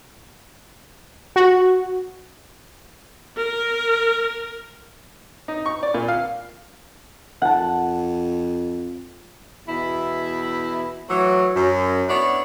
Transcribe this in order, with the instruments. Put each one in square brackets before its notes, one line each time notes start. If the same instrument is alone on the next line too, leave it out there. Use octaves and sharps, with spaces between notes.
[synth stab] F#4
[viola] A#4
[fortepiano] D#4
C#6
D5
A#2
F5
[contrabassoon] F2 [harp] F#5 A5
[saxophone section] E2 B2 E4
A2 E3 F#3
F#2
B3 D4 E4 C#5 D5